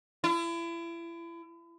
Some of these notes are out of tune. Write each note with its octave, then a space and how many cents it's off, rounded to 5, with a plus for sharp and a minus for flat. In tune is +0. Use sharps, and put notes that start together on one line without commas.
E4 +35